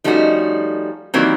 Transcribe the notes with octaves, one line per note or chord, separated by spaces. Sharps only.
F3 G3 A3 C#4 D#4 F#4
D#3 E3 F#3 G3 A#3 C4